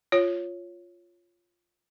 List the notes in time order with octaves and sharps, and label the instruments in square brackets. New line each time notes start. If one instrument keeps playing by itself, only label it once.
[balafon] F4 C#5